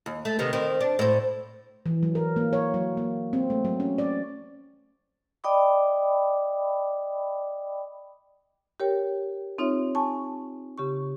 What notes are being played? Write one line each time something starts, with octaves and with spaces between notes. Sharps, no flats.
D#2
A3
C3 D#3 B3
D#3 C4
D4
A2 C5
E3
F#3
A#4
A#3
C#5
F#3
A#3
C4
A3
F#3
C#4
D5
D5 D#5 G5 B5 D6 D#6
G4 A#4 C#5 G5
C4 D#4 F4 C#5 E5
G#5 A5 C#6
C#3 G4 C#6